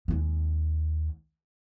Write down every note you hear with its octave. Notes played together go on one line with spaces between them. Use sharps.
D#2 G#3